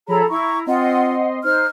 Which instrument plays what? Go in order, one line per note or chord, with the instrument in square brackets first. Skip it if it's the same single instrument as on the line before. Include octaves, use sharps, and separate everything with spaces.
[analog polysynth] F3 B5 [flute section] G#4 A4 A#5 [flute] C#5
[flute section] E4 [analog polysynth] A#5 [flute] C#6
[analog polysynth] C4 D#5 C6 [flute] F4 [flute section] F#5
[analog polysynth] D#4 [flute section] C5 [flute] F6